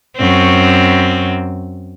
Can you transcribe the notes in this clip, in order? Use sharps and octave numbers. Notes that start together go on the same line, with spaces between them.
F#2 C4